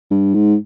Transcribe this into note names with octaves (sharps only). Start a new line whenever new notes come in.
G2
G#2